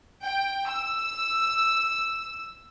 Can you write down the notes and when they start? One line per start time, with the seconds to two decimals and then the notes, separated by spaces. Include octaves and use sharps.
0.24 G5
0.70 E6